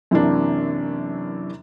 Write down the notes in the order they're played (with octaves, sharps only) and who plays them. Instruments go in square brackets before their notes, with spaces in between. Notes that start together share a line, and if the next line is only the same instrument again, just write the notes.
[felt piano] F#2 C3 E3 A#3 D4